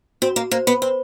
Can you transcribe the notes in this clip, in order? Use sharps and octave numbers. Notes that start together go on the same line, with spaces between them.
C4 F#4
A#3
A#3 C5
B3
C4 C5